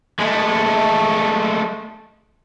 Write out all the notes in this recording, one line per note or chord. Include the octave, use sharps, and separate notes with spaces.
G#3 A3